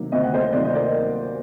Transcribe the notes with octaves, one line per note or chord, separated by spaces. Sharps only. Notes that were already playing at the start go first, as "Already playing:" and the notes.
Already playing: C3 D#3 F#3 A#3
D2 D#5
F#5
C5 D#5
C3 D#3 F#3 A#3 D5
D#5
A#4 D5